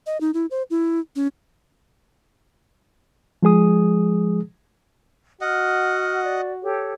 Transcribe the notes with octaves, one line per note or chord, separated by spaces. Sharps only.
D#5
D#4
E4
C5
E4
C#4
F3 G#3 G#4 D#6
F#4 D#5 F#5 F6
D5
G4 A4 C#5